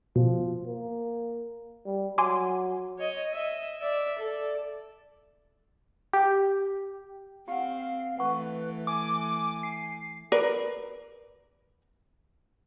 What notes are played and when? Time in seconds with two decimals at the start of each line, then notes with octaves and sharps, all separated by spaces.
0.16 B2 F3
0.66 A#3
1.86 G3
2.18 F#3 G#5 C6 D6
2.98 C#5 D#5
3.31 D#5 E5
3.80 D5 E5
4.19 A4 D5
6.13 G4
7.48 C4 G4 F5 F#5
8.19 E3 A3 B4 F#5 C#6
8.87 G#5 D6
9.63 C7
10.32 A#4 B4 D5